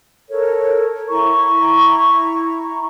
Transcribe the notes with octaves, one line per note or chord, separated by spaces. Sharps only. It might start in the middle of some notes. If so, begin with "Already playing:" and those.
A4 A#4 C#5
E4 A#5 C#6